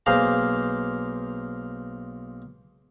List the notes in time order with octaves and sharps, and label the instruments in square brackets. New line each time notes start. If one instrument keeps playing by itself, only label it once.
[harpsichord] B1 A#3 G#4 C5 F5 A#5